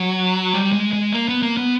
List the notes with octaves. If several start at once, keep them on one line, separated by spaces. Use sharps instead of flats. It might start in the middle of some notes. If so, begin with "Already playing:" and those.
Already playing: F#3
G3
G#3
G#3
A#3
B3
A#3
B3